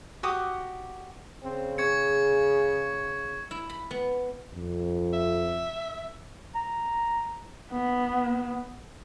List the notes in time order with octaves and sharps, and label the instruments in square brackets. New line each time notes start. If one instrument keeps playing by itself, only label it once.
[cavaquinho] F#4 G4 D6 D#6
[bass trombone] C#3 [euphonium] C4
[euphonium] G#4 [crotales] C#6 G#6 C#7
[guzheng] E4
B5
B3
[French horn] F2
[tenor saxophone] E5
[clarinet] A#5
[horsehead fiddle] B3